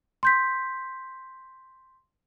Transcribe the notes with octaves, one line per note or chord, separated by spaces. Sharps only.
C6 G6 B6